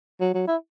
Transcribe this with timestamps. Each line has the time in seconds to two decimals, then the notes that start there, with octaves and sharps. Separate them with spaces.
0.21 F#3
0.34 F#3
0.47 E4